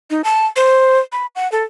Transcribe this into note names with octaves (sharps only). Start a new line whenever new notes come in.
D#4
A5
C5
B5
F#5
A4